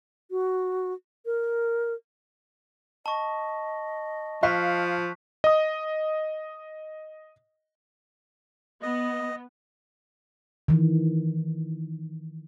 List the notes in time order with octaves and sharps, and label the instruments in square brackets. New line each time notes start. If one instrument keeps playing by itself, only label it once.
[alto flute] F#4
A#4
[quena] D#5 [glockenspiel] A5 C#6
[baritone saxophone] F3 [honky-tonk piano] F5 [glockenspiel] C#6 F#6 B6
[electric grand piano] D#5 D#6
[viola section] B3 [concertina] D#5
[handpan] D#3 E3